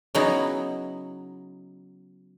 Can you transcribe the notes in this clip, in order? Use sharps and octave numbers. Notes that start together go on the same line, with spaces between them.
C#3 F#3 B3 D#4 E4